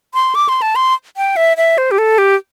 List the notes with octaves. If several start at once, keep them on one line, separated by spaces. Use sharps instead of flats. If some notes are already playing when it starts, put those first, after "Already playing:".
C6
D6
C6
A5
C6
G5
E5
E5
C5
G4
A4
G4